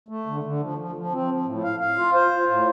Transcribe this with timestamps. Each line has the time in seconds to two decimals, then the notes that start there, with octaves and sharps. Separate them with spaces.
0.09 A3
0.26 D3
0.44 D3
0.60 F3
0.78 F3
0.95 F3
1.12 C4
1.28 F3
1.46 A2
1.64 F5
1.80 F5
1.98 F4
2.14 C5
2.31 F4
2.49 A2